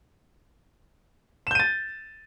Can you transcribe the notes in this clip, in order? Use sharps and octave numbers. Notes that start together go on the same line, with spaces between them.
G6 A6 D#7 E7